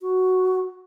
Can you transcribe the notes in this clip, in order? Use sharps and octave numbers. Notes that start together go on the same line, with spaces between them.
F#4